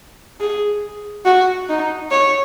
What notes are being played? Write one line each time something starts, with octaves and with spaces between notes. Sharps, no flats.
G#4
F#4
D#4
C#5